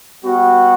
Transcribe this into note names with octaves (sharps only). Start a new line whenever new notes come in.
G3 B3 F#4